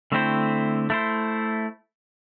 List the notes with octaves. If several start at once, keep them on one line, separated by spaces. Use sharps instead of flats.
D3 A3 C4 E4 C5
A3 E4 C5